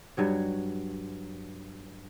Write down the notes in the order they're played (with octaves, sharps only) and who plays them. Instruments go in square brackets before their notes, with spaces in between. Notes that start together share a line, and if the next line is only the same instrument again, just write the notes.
[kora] G2 F#3 C#5